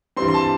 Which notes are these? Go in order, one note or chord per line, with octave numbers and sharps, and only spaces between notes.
G2 E3 G3 C4 C6
C6
A5